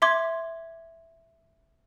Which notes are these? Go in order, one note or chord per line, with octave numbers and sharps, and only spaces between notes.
E5 C6 D6 G#6